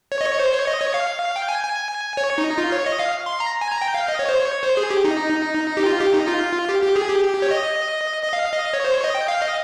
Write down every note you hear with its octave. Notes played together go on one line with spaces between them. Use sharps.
C#5
D#5
C#5
C5
C#5
D#5
C#5
F5
G5
G#5
G#5
C#5
D#4
F4
C#5
D#5
F5
C6
A#5
G#5
A#5
G5
F5
D#5
C#5
C5
C#5
C5
G#4
G4
D#4
G4
F4
G4
D#4
F4
G4
G4
G#4
G4
C#5
D#5
D#5
F5
D#5
C#5
C5
C#5
D#5
G5
F5
D#5